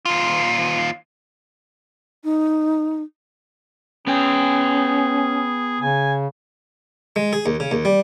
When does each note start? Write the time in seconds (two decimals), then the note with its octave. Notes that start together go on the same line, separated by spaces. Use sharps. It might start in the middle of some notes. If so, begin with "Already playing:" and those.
0.05 D#2 F4
2.24 D#4
4.07 B3 C#4 G#4 G5
5.81 C#3 G#5
7.16 G#3
7.33 G#4
7.46 D#2
7.60 C#3
7.71 D#2
7.85 G3